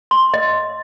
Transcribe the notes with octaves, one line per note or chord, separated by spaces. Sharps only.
C6
D#5